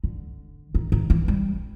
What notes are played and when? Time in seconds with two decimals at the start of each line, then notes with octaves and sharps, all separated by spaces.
0.04 D3
0.75 D#3
0.92 D#3
1.10 E3
1.28 G3